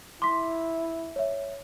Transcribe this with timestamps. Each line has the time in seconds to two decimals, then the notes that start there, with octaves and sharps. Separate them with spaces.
0.22 E4 C6 D6 B6
1.16 C#5 E5